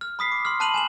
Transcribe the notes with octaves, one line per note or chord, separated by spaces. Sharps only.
F6
B5 D#6 B6 C7
D6
C6 F6
A5 B5 F#6 D#7 F7 F#7
G#5 E7 F#7